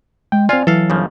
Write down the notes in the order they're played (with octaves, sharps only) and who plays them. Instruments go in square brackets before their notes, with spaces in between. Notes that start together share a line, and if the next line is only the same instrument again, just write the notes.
[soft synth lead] G#3 [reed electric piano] G5
[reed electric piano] C4 G#5 [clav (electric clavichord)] F4 F5 [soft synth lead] D5
[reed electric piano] E3 [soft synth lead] F#3 [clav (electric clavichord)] A4 F5
[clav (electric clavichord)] G1 C#3 F3